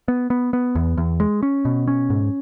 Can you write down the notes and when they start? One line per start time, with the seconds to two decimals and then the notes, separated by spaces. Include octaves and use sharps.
0.08 B3
0.30 B3
0.53 B3
0.75 E2
0.97 E2
1.20 G#3
1.43 C#4
1.65 B2
1.88 C#4
2.10 G#2